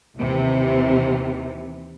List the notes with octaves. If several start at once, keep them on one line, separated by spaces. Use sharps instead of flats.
D#2 C3 E3